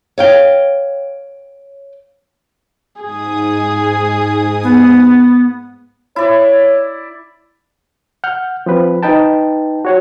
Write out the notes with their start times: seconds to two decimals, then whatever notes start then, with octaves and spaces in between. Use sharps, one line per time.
0.18 C#5 F5 G5
3.02 G#2 G#4 D#6
4.63 B3
6.16 E4 C#5 D5
8.24 F#5 F6 G6
8.66 F3 C4 B4
9.03 D#4 B4 G5 A5
9.85 F#4 C#5 F#5